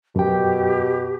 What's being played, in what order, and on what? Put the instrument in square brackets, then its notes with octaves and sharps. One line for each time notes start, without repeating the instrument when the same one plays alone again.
[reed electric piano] F#2 G5 [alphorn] B2 [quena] G4